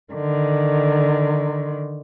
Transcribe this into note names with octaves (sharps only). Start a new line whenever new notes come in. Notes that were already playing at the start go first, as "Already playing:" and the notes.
D3 D#3